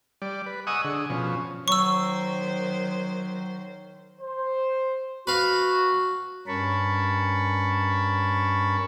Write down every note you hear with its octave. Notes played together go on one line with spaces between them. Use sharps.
G3 D5
B4
D#5 F#5 G#5 C#6 D#6 E6
D3 G#4
B2 F3 C#4
D#3 F#3 C5 C#6 E6
C5
F#4 B4 F5
G2 C#4 A#4 A5 B5 C#6